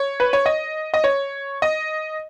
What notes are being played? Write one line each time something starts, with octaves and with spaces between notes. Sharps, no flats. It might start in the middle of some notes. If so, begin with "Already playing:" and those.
Already playing: C#5
B4
C#5
D#5
D#5
C#5
D#5